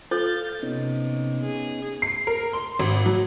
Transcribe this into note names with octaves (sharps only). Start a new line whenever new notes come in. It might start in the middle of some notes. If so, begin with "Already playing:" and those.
F4 A4 C5 F5 G6 A6
C3 B3 C#4 D#4
G#4
C7
A#4
C6
G#1
F#3